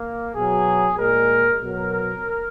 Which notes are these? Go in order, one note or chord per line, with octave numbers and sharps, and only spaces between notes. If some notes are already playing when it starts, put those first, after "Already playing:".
Already playing: A#3
B2 F#3 G#4
A#2 G#3 A#4
B2 F#3 A#4